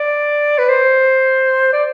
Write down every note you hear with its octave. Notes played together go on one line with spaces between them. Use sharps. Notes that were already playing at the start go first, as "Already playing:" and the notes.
Already playing: D5
B4
C5
D5